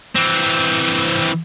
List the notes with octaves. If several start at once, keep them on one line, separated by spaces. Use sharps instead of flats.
E3 C4